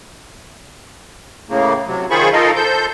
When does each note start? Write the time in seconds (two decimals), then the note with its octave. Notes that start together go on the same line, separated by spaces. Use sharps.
1.49 A2 C#3 A#3
1.87 C3 F#3
2.10 D#3 F4 G#4 C5 B5 C#6
2.33 D#4 F4 A4 A#4 D#5 F5
2.56 A4 C5 G6